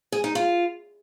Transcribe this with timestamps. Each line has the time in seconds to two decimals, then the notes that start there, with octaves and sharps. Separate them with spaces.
0.12 G#4
0.24 D#4
0.35 F4